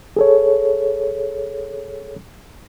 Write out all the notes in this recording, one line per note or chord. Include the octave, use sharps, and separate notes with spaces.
G#4 A4 C#5